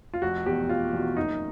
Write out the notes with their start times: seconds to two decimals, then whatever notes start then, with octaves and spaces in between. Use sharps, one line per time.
0.14 F4
0.22 F1 F#4
0.46 E2 B2 G4
0.69 F1 F4
0.93 E2 B2
1.17 F#1 D#4